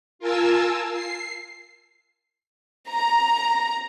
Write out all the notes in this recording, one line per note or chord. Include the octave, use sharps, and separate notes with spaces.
F4 A#4 G#5 A5 E6
C7
A#5